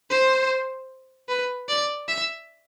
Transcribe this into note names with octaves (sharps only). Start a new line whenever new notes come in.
C5
B4
D5
E5